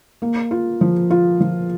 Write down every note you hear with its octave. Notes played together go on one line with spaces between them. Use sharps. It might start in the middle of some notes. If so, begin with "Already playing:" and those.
A#3
F4
F3
F4
F3